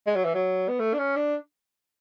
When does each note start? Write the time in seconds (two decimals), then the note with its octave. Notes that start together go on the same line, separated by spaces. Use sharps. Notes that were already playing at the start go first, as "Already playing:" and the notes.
0.06 G#3
0.16 F#3
0.25 E3
0.34 F#3
0.68 B3
0.79 A3
0.93 D4
0.98 C#4
1.16 D4